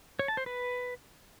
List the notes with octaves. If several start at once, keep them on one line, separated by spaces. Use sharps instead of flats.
C#5
A5
C5
B4